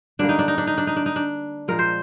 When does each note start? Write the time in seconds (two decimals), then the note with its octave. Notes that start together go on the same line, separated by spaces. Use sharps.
0.19 D3 G3 A#3 D4
0.29 D#4
0.39 D4
0.48 D#4
0.58 D4
0.67 D#4
0.78 D4
0.87 D#4
0.96 D4
1.06 D#4
1.16 D4
1.68 A#2 F3 G#3 A#4
1.79 C5